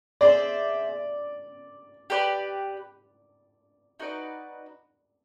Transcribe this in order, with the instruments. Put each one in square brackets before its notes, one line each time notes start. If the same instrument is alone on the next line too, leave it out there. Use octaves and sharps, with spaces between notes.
[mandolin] G#4 C5 E5 [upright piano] D5
[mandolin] G4 B4 D5
D#4 F#4 B4 D5